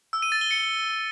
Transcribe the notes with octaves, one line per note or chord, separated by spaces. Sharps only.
E6
D#7
A6
G7
C#7